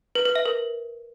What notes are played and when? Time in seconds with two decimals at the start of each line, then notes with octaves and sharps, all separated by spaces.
0.15 B4
0.25 B4
0.35 E5
0.46 A#4